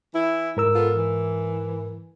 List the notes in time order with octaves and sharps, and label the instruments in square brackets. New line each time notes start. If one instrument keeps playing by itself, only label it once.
[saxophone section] E3 E4
[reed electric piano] G#2 A#4 E6
[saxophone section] B3 F4 A4
E3